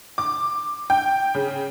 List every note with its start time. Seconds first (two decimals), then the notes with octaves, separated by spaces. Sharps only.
0.18 D6
0.90 G5
1.35 C#3